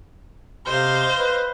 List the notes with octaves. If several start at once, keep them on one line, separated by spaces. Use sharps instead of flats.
C3 C5 D#5 F5
B4